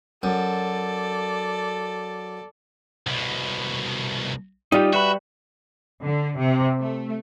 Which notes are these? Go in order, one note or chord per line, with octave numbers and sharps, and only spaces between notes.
F#2 A4 D5
C2 B2
G3 D#4 F4 G4
F#4 B4 E5 B5
D3
C3
A3